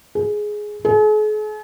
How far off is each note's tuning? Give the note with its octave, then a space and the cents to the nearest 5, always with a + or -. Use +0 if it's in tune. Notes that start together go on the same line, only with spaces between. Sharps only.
G#4 +10
G#4 +45